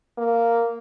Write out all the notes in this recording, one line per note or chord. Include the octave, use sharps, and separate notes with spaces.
A#3